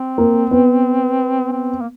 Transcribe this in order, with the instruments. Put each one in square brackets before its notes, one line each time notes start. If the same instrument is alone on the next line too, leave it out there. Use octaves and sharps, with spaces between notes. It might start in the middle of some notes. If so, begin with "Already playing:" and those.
Already playing: [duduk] C4
[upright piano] A#3
B3
[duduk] C4
A#3